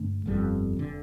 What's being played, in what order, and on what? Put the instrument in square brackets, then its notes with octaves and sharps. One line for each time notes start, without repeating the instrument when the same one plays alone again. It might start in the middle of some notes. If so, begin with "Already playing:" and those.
Already playing: [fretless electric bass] G2 D3 A3 D4
G1 F2 C3 G3
F1 D3